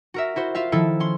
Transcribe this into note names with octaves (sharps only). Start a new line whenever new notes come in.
F#4 A#4 E5
E4 F#4 C5
F4 E5 F5
D#3 F3 E4 A4
C#4 C6